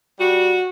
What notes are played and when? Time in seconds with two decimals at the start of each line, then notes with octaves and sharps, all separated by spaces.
0.19 G3 F#4